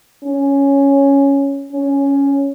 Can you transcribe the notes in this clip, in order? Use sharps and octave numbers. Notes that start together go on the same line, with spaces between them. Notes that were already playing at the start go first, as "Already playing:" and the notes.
C#4
C#4